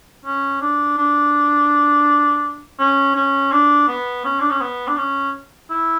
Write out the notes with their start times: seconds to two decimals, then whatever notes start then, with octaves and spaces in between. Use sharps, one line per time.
0.25 C#4
0.62 D4
0.98 D4
2.79 C#4
3.16 C#4
3.52 D4
3.88 B3
4.25 C#4
4.40 D4
4.51 C#4
4.61 B3
4.88 D4
4.97 C#4
5.70 E4